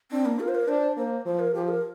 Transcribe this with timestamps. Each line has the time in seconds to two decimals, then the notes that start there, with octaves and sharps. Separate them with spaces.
0.11 C4 D4
0.26 A#3
0.40 F4 A#4
0.48 C5
0.55 A#4
0.68 D4 C5
0.97 A#3 C5
1.25 F3 C5
1.39 A#4
1.54 F3 G4
1.68 A#4